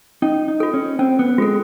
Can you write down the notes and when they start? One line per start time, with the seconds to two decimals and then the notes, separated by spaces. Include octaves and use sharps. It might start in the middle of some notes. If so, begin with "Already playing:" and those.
0.22 C#4 D#4
0.48 D#4
0.60 F4 A4
0.74 C#4
0.99 C4 C#4
1.19 B3
1.38 G#3 F4 A4